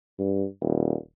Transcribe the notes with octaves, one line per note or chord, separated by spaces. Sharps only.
G2
D#1